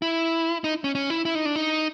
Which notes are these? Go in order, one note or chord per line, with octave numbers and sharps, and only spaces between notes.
E4
D#4
C#4
C#4
E4
E4
D#4
D4
D#4